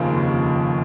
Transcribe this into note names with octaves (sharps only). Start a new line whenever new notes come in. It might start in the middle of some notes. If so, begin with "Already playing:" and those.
Already playing: F1 D#2 C#3 F3 A#3
F1